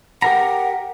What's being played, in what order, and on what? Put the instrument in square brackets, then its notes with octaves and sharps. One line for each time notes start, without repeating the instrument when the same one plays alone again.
[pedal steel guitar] G4 A#4 A#5 [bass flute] F#5